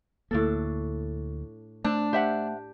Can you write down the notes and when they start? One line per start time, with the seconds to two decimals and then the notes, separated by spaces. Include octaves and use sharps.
0.31 D2 A2 A#3 D4 A4
1.84 A3 C4 D4
2.13 G4 C5 E5 F#5